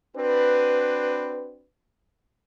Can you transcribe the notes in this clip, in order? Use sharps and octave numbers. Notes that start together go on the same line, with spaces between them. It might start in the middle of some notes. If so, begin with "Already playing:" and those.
C4 D4 F#4 B4